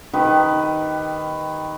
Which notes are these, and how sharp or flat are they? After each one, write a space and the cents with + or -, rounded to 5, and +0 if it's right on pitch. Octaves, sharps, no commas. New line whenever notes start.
D#3 +0 G4 +0 B4 +15